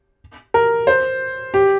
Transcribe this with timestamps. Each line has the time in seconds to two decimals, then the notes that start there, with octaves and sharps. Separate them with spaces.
0.54 A#4
0.87 C5
1.54 G4